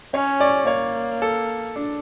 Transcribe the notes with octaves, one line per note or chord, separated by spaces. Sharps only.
C#4 C#5
D5
A#3 C#5
A4
D4